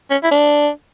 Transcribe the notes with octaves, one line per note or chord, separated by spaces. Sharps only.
C#4
E4
D4